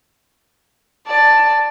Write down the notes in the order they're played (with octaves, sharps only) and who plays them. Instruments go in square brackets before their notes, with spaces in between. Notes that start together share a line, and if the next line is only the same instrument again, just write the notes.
[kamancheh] D5 [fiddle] A5